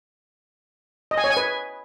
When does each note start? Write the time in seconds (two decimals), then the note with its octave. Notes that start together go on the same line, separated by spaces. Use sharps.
1.11 D#5
1.18 G#5
1.24 C#5
1.30 G#5
1.37 B4